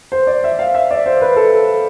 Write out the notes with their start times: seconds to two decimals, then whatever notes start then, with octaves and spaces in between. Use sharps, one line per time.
0.12 C5
0.27 D5
0.44 E5
0.59 F5
0.75 E5
0.91 D5
1.06 C5
1.21 B4
1.36 A4